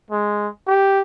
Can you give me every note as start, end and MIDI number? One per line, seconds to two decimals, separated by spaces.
0.11 0.48 56
0.68 1.02 67